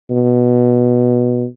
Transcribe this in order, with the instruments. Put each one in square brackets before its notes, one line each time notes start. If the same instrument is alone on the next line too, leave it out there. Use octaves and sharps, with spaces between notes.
[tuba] B2